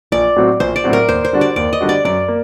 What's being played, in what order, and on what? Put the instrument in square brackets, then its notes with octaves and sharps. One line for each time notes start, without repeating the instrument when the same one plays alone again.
[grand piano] A#1 [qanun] D5
[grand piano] A2 F#3 C4 F#4
[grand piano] A#1 [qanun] C5
[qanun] D5
[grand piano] A2 F#3 C4 F#4
[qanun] A#4
[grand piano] D#2 [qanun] C5
[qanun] C5
[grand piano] D3 G3 D4 F#4
[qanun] D5
[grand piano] D#2 [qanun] D5
[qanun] D#5
[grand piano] D3 G3 D4 F#4
[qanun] D5
[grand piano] F#2 [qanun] D5
[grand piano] A#3